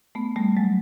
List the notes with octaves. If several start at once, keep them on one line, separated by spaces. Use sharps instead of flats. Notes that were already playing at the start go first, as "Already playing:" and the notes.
A3 B3
G3 A3
F#3 G#3